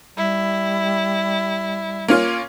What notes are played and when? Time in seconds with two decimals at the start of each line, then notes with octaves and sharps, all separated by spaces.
0.17 G3 E4
2.08 A#3 C#4 F4